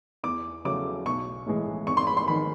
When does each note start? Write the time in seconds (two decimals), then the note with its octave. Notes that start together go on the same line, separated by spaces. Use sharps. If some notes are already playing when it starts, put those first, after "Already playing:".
0.23 E2 D6
0.65 C#3 F#3 A3 D6
1.05 B1 C#6
1.46 A2 E3 G#3
1.87 G#1 C#6
1.97 C6
2.07 B5
2.17 C6
2.28 D#3 B5